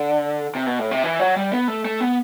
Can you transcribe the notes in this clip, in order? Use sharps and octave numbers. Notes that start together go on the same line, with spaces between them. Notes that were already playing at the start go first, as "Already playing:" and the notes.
Already playing: D3
C3
B2
A2
C3
E3
F#3
G3
B3
A3
A3
B3